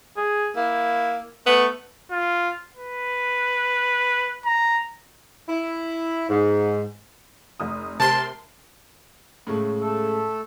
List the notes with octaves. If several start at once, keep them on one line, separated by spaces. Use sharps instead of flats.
G#4
A#3 E4
A3 B3
F4
B4
A#5
E4
G#2
F1 D#6
C3 A#4 A5 C6
A2 C#3 G#3 A3
A3 A4